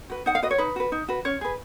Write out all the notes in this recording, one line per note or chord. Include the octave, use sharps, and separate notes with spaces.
F#4 B4
D#4 F#5
F5
F#4 B4 D#5
C#5
D#4 B4
F#4 B4
D#4
F#4 B4
C#4 C#5
G#4 B4